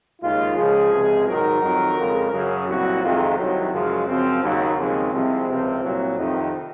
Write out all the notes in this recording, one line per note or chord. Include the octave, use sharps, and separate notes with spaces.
D#2 C#3 G#3 F4
C#2 C#3 F3 G#3 G#4
C#2 C3 F3 G#3
G#2 D#3 F#3 A#4
F2 D#3 F#3
F2 C#3 G#3
F#2 C#3 F#3 G#4
C2 A#2 F#3 F#4
F2 C3 D#3 G#3 F4
C2 C3 D#3 F#3
F#2 C#3 F3 G#3
F#2 C#3 F3 C4
D#2 C#3 F#3 A#3
D#2 C#3 F3 G#3 C4
C2 C3 F3 G#3
C#2 C3 F3
C2 A#2 F#3
F2 C3 D#3 D#4